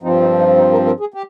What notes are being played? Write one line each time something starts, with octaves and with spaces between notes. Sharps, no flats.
G2 F3 C4 D#4
D#4
D#4
D#4
A#4
A#4
G#4
G4